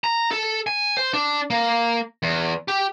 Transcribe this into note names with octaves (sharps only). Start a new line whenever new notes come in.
A#5
A4
G#5
C5
D4
A#3
E2
G4